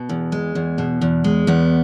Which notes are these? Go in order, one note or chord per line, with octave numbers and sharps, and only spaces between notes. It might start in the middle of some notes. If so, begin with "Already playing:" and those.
Already playing: B2
E2
G#3
E2
B2
E2
G#3
E2 B3